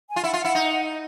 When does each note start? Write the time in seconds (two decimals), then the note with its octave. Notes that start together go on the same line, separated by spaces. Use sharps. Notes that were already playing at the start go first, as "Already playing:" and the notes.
0.08 G#5
0.16 F4
0.24 E4 F#5
0.33 F4
0.39 F#5
0.45 E4
0.55 D#4